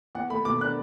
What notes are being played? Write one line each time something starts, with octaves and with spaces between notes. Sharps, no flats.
E2 F#5
A3 B5
B2 D6
D4 F#6